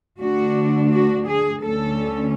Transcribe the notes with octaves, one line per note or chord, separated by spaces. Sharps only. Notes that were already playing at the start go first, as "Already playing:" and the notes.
D2 D3 A3 D4 F#4
F#4
G#4
D2 D3 A3 C#4 A4